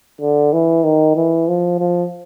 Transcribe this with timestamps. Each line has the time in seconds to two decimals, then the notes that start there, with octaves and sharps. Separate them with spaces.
0.21 D3
0.53 E3
0.84 D#3
1.16 E3
1.48 F3
1.79 F3